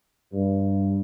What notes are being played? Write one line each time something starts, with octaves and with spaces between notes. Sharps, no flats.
G2